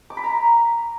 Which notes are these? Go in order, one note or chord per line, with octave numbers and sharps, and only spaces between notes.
D6
B5
A#5